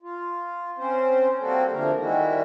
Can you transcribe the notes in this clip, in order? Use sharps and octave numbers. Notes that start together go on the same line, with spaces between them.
F4
C4 C#4 C5
G3 A#3 C4 F#4 A4
D3 F3 A3 A#3 A#4
D#3 G3 G#3 E4 F#4